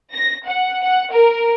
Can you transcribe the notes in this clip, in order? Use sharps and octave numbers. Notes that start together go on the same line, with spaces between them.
A#6
F#5
F#5
A#4